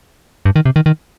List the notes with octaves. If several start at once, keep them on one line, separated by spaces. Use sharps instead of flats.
G2
D#3
C3
D#3
D#3